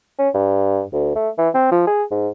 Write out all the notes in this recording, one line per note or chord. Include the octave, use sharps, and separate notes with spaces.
C#4
G2
D2
A3
E3
C4
F3
G#4
G#2